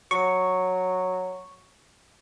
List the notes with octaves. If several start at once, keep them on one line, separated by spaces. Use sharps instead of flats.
F#3 C#6